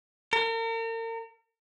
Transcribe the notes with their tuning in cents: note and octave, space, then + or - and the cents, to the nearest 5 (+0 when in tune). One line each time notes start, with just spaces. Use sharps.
A#4 -40